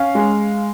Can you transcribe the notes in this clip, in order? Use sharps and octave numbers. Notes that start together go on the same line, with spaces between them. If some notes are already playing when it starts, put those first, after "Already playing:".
Already playing: C#4 F5
G#3